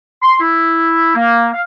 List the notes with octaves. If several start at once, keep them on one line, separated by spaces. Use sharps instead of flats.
C6
E4
A#3
F5